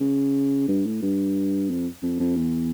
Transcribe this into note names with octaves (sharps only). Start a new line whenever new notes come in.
C#3
G2
A2
G2
F2
F2
F2
E2